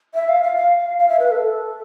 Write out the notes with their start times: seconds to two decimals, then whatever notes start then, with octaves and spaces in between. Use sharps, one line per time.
0.14 E5
0.29 F5
0.43 F5
0.56 F5
0.99 F5
1.09 E5
1.19 B4
1.31 A4